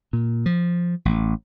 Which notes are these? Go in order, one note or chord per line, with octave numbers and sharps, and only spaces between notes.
A#2
F3
A1